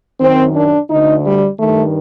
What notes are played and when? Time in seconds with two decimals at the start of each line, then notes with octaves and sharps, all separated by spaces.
0.20 F#2 D#3 C4
0.55 D4
0.90 D2 D3 D#4
1.25 G3
1.59 G2 D#3 A3